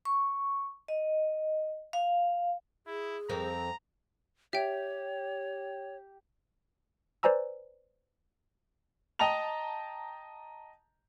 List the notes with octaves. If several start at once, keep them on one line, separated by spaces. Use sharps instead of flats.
C#6
D#5
F5
E4 G#4
F2 C4 A#4 A#5
G4 C#5 E5 G5
B4 C5 D5 G#5 A#5 E6
D#5 G5 A5 A#5 F7